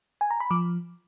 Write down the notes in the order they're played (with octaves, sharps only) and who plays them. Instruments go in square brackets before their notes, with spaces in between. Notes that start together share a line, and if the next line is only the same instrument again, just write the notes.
[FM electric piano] G#5
A#5
B5
F3 D6